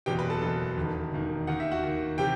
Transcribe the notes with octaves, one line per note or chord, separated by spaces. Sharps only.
F#1 E2 B2 G4 G5
B4 B5
A4 A5
F#1 E2 B2 A4 A5
E1 D#2 D#3
E1 D#2 D#3
D#2 D#3 F#5
E5
F#4 F#5
D#2 D#3
C3 E3 G4 G5